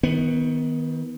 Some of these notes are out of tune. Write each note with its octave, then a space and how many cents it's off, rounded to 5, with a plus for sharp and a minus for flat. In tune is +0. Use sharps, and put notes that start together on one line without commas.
D#3 +30 B3 +0